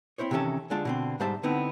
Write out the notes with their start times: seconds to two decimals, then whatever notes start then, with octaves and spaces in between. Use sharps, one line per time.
0.18 C4 C#4 E4 C5 C#5
0.31 C3 D#3 E3 C#4 A4
0.70 D3 G#3 D4 F4 A5
0.85 B2 D3 C4
1.20 G#2 G3 C5 E5 A5
1.43 D3 B3 C4 D#4 E4